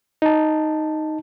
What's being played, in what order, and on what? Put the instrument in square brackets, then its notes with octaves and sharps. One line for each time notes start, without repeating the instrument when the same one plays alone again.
[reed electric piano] D#4 A5